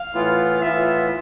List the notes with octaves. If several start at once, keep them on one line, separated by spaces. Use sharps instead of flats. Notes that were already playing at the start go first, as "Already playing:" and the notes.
Already playing: F5
A2 E3 B3 F4
A2 E3 B3 F4 E5